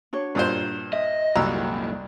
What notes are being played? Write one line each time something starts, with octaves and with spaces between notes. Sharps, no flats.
D4 F#4 C#5
G2 A#2 C5
D#5 E5
C2 F#2 A#2 F#4 A#5 E6